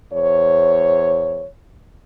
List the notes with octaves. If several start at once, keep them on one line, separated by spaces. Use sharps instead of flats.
E2 C5 C#5